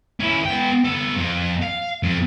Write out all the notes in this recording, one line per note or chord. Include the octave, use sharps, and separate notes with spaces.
C#4 E4
B3 G5
B3 A4
F2
F5
F2